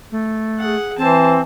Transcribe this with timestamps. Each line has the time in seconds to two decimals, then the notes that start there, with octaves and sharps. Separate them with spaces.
0.11 A3
0.59 G#4 F#5
0.98 E3 C4 C5 A5